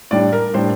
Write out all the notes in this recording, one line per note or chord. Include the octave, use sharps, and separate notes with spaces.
A2 G3 D4 D5
A#4
A2 G3 D4 C5